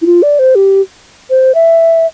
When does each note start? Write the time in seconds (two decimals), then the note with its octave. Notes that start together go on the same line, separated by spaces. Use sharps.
0.02 E4
0.06 F4
0.23 D5
0.39 C5
0.55 G4
1.30 C5
1.55 E5